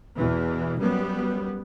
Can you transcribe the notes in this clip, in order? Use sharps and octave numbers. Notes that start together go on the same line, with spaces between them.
E2 B2 E3
F#2 G3 B3